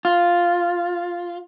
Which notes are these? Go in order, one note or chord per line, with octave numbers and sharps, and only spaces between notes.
F4